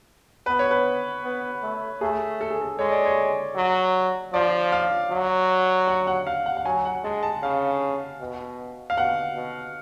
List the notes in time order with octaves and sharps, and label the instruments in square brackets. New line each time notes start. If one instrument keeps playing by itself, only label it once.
[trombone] B3 [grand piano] B4
[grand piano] C#5
B4
[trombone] B3
A3
[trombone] A3 [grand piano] G#4
[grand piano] A4
G#4
A4
[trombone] G#3 [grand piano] C#5
[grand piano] D5
C#5
[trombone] F#3
[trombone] F3 [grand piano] D5
[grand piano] F5
[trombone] F#3
[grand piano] F#5
F#5
F5
F#5
F#5
[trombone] F#3 [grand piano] G#5
[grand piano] F#5
[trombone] G#3 [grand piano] A5
[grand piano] A5
[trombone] C#3 [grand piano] F5
[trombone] B2
[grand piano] F5
[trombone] B2 [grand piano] F#5
[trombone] B2